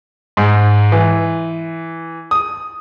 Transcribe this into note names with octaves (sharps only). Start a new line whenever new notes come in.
G#2
E3
D#6